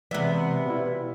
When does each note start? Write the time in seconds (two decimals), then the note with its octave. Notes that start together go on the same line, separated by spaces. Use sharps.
0.11 C3 E3 G#3 B3 D5 E5 F#5
0.66 B2 E4 D5 F5